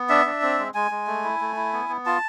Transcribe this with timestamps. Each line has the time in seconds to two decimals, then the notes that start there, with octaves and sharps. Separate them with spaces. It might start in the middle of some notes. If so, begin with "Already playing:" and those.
Already playing: B3
0.09 D4 E5
0.26 D4
0.42 C4
0.59 G#3
0.74 G#3 G#5
0.91 G#3
1.07 A3
1.24 E4
1.41 A3
1.57 E4
1.73 B3
1.89 B3
2.06 F4 A5